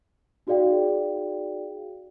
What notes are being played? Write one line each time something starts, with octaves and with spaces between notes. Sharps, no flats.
D#4 F#4 G#4 D5 F5 G5